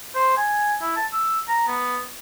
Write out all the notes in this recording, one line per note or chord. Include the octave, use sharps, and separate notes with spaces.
C5
G#5
E4
A5
E6
A#5
B3